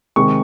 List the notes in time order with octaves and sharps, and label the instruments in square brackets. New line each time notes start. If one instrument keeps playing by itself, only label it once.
[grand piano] C3 D#3 G#3 C#6